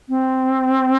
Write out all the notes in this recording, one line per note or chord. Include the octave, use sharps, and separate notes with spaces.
C4